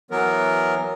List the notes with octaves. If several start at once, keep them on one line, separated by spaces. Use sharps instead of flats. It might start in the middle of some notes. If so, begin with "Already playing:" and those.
E3 F#3 B3 A#4